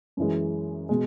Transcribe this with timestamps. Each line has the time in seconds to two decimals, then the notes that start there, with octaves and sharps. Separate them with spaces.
0.17 F#2 E3 G#3
0.89 B2 G#3